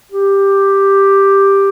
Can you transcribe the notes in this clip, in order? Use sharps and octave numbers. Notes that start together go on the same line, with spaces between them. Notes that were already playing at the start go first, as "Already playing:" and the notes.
G4